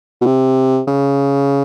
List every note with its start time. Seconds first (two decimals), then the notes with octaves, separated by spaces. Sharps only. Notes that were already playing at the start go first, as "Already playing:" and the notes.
0.22 B2
0.26 C3
0.88 C#3